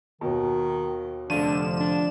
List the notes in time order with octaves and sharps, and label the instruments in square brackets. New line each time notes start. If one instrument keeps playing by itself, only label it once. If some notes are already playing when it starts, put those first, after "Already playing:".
[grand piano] D#2 B2 [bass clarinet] D#3
[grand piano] F1 D#7 [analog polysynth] D3 F3 E7 [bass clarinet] D4
[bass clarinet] D4